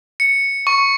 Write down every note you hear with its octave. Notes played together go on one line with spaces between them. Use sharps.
C#7
C#6